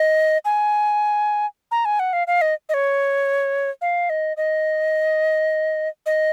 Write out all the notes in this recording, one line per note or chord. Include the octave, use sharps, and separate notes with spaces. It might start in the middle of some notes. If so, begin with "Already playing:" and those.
Already playing: D#5
G#5
A#5
G#5
F#5
F5
F5
D#5
D#5
C#5
F5
D#5
D#5
D#5